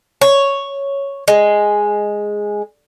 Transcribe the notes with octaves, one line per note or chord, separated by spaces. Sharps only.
C#5
G#3